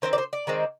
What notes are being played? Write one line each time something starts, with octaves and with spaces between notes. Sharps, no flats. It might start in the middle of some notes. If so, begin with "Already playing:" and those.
D#3 G#3 C4 C5
D5
C5
D5
D#3 G#3 C4